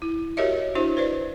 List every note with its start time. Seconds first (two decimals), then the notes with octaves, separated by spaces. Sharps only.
0.02 E4
0.37 F#4 G4 A#4 C#5 D#5 E5
0.75 D4 E4 F#4 C5
0.97 B4 C5 D5